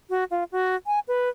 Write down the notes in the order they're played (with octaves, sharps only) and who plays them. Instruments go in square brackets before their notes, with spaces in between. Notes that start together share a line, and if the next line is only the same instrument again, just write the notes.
[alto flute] F#4
F4
F#4
G#5
B4